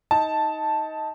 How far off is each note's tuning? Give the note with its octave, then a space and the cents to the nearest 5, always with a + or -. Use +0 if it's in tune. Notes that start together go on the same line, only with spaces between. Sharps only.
D#4 +20 A5 +0